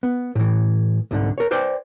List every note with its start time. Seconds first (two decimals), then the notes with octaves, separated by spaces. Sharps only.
0.03 B3
0.35 A2 E3
1.11 C2 G#2 D3
1.38 A#4 C#5
1.51 B4 C5 D5 G5